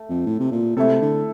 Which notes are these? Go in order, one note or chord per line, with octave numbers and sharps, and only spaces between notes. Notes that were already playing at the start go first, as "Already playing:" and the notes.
Already playing: A3
F2
A2
C3
A#2
C3 A3 E4 A4
D3